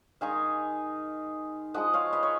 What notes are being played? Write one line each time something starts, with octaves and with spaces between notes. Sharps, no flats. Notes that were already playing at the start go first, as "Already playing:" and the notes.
D#3 G#3 D#4 F5 G#5
F3 G#3 D#4 D#5 F#5
C#5 F5
B4 D#5
C#5